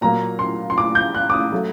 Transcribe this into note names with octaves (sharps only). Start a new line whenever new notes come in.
A#2 F#3 A#3 A#5
C6
C6
D6
G6
F#6
D6
D#6
F#3 A3